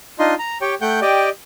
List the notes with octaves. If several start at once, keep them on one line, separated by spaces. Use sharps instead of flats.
D4 D#4 F4 D#5 C6
A#5
G4 C#5 G5
A3 F#5 G5 G6
G4 D5 D#5 G5